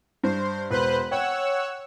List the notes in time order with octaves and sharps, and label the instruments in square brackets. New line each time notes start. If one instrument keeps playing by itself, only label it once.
[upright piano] G2 [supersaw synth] C5
[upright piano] E1 [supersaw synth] B4 C5 F#6
[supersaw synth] C#5 F#5 E6 [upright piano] G5